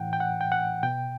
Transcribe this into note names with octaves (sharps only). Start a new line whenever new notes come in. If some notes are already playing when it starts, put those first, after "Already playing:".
Already playing: A2 E3 F#5 G5
G5
F#5
G5
F#5
B2 G5